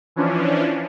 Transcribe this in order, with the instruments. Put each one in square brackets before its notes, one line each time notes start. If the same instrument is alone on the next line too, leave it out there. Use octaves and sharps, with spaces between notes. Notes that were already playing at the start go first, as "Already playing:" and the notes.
[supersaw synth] E3 F3 C#4 D4